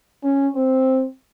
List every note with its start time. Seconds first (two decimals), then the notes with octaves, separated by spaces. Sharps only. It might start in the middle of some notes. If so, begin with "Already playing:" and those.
0.23 C#4
0.56 C4